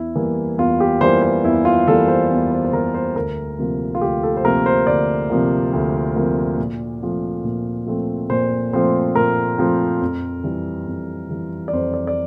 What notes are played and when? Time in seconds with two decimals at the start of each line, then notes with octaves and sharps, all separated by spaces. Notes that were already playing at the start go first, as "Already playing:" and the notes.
Already playing: E2 E4
0.16 E3 G3 A#3
0.58 E2 F4
0.80 G4
1.01 E3 G3 A#3 C5
1.22 C5
1.44 E2 E4
1.65 F4
1.87 E3 G3 A#3 A4
2.08 C5
2.30 E2
2.51 C5
2.65 C5
2.72 E3 G3 A#3 A#4
2.94 C5
3.16 D2 A#4
3.59 C3 F3 A#3
3.95 F4
4.01 D2 G4
4.23 A4
4.37 C5
4.44 C3 F3 A#3 A#4
4.66 C5
4.87 D2 D5
5.30 C3 F3 A#3
5.73 D2
6.16 C3 F3 A#3
6.58 A#2
7.01 F3 A3 C4
7.44 A#2
7.86 F3 A3 C4
8.29 A#2 C5
8.73 F3 A3 C4 C5
9.15 A#2 A#4
9.58 F3 A3 C4
10.01 F2
10.44 E3 G3
10.87 F2
11.30 E3 G3
11.68 D5
11.73 F2 C5
11.94 D5
12.07 D5